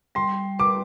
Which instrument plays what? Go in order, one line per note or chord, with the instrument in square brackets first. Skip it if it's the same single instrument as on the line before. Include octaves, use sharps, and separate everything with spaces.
[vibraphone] G3 [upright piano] C6
[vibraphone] B4 [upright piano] D6